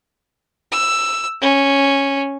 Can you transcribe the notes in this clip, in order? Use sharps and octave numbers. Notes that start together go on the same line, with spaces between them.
E6
C#4